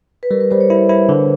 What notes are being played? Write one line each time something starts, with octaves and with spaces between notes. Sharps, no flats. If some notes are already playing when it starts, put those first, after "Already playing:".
B4
G3 A#4
B4
G3 C5
C#5
E4
E4
D3